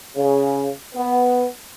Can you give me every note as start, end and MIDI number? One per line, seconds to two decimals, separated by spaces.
0.16 0.69 49
0.95 1.46 59